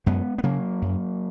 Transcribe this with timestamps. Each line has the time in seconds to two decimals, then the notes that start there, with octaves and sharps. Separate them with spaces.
0.06 F#2 G#3 B3
0.38 B3
0.43 C#3 F#3 A#3
0.82 F#2